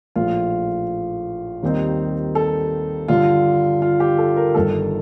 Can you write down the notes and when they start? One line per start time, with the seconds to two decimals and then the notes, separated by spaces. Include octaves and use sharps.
0.16 A#1 A2 A3 F4
1.62 D#2 D#3 G3 C4 D#4
2.35 A4
3.08 G2 D3 G3 F4
3.82 F4
4.00 G4
4.18 A4
4.37 A#4
4.55 G1 G2 D#3 A4